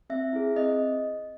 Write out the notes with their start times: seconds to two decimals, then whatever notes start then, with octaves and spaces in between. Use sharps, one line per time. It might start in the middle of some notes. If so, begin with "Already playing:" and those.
0.10 C4 E5
0.33 E4 G#4
0.56 C4 D#5